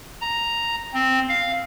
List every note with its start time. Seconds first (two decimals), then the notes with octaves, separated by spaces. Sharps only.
0.21 A#5
0.94 C4
1.29 F5